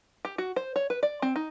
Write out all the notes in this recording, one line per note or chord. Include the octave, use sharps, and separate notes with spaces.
G4
F#4
C5
C#5
B4
D5
C4
D#4